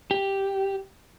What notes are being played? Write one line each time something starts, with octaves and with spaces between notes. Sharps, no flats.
G4